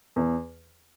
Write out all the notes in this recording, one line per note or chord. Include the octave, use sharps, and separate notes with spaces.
E2